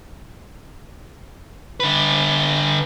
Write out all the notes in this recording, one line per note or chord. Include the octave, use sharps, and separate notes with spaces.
D3 B4